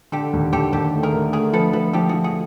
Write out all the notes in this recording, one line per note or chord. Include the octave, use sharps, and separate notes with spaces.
D3 G4 A4
D#2
D#2 G4 A4
D#2 G4 A4
A3
G#4 A#4
D3
A3 G#4 A#4
F3 A4 B4
F3 A4 B4
F3 G4 A4
F3 F#4 G#4
F#4 G#4